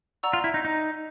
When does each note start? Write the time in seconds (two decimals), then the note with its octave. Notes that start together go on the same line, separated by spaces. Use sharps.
0.23 D5 F#5 A#5 C#6 E6
0.33 F4
0.44 E4
0.54 D#4
0.65 D#4